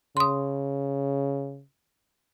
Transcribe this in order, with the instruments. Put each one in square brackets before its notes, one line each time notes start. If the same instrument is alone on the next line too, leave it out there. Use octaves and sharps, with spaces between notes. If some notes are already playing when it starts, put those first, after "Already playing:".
[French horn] C#3 [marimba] C6 D#6